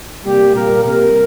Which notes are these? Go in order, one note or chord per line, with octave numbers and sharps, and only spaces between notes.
C3 G3 A#3 G4
A#2 G3 A#3 A#4
C3 G3 A#3 A#4